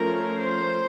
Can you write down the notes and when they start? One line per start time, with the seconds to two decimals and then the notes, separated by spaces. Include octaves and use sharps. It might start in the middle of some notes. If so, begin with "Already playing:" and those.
Already playing: F3 A3 C#4 A#4
0.42 C5